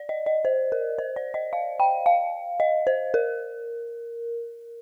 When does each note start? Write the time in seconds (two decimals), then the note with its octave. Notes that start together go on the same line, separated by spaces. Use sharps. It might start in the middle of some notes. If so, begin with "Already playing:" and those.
Already playing: D5
0.09 D#5
0.26 D#5
0.45 C5
0.72 A#4
0.98 C5
1.16 D5
1.34 D#5
1.53 F5
1.80 G5
2.06 F5
2.60 D#5
2.87 C5
3.14 A#4